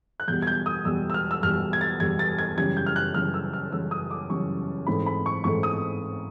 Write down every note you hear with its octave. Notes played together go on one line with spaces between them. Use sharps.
F#6
E2 B2 G3 G6
G#6
G6
D#6
E2 B2 G3 E6
E6
F6
E6
E2 B2 G3 F6
G#6
A6
E2 B2 G3 G#6
A6
G#6
F#2 C#3 E3 G3 G#6
G6
F6
F#6
F#2 C#3 E3 G3 F6
E6
F6
F#2 C#3 E3 G3 E6
D#6
D6
F#2 C#3 E3 G3 C#6
G#2 E3 A3 C4 D#4 B5
B5
C#6
G#2 E3 A3 C4 D#4 C#6
D#6